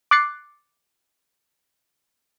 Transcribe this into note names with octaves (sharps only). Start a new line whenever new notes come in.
D6 F#6 A6 C7 C#7